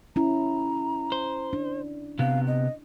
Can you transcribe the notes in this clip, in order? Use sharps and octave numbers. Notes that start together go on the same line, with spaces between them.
C#4 E4 A#5
C5
D4
C3 B3 F5
D#5